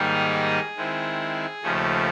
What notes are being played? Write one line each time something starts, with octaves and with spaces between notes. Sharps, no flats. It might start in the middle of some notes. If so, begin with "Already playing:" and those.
Already playing: G#2 D#3 G3 A#3 D#4 G#4
D#3 G#3 C4 E4
D#2 C#3 F3 A3 A4